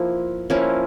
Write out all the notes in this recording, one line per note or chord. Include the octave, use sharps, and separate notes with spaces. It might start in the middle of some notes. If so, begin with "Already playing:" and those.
Already playing: F3 A#3 E4
F3 A#3 C#4 E4